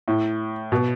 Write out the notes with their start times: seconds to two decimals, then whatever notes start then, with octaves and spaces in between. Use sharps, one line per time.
0.08 A2
0.72 B2